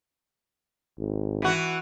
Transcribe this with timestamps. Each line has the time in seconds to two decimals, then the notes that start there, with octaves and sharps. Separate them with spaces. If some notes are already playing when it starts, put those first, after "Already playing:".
0.99 G#1
1.42 E3 F#4